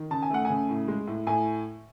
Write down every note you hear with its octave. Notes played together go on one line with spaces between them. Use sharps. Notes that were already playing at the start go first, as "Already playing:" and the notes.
Already playing: D#3
C#3 A5
G#5
A3 F#5
G#5
C#3
A2
G#3
A2
A2 G#5